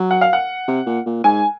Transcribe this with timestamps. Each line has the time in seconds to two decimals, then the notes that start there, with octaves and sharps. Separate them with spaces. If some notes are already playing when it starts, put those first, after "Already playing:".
Already playing: F#3
0.11 F#5
0.21 F5
0.33 F#5
0.68 C3
0.86 A#2
1.06 A#2
1.24 G#2 G#5